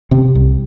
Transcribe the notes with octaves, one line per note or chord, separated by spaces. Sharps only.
C3 C4
C2